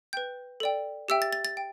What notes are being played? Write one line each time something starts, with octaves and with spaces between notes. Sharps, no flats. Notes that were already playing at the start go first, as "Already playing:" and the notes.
B4 G5 G6
A4 D5 G5
G4 E5 G5 E6
A6
A6
A6
G5